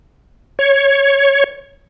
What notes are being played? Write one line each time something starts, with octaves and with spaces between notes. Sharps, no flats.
C#5